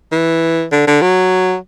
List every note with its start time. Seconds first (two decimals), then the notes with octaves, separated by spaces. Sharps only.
0.12 E3
0.72 D3
0.87 D3
1.02 F#3